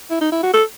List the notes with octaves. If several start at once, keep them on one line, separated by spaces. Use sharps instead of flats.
E4
D#4
E4
F#4
A4